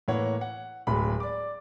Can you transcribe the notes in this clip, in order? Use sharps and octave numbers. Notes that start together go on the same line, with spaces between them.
A2 E3 A#3 C#5 F#5
F#5
D1 A2 F#3 G#3 B5
D5 D6